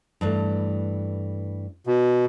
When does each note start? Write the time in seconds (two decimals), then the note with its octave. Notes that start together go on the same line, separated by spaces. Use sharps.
0.21 G2 E3 A3
1.87 B2